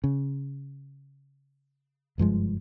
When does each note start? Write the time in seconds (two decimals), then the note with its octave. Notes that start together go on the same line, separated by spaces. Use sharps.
0.04 C#3
2.18 F#1 G2 F3 G#3